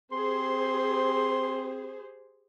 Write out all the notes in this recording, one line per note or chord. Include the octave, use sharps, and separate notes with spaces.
C4 G4 G#4 C5 C6